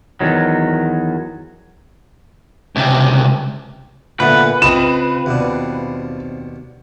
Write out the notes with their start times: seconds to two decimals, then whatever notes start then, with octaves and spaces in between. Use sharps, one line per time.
0.21 E2 D#3 F#3
2.76 C#2 C3
4.20 A#2 D3 A3 B3 B4
4.62 C#2 C4 F4 D#5 E7
5.26 D#2 B2 D4